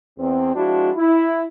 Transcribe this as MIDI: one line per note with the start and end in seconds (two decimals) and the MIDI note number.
0.19 0.55 40
0.19 0.55 60
0.55 0.90 53
0.55 0.90 56
0.55 0.90 62
0.55 0.90 64
0.55 0.90 66
0.95 1.43 64